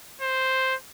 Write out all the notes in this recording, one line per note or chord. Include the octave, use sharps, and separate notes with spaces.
C5